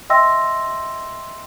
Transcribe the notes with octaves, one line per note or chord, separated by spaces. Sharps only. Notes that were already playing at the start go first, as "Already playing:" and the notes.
D#5 E5 G5 C6 E6 A#6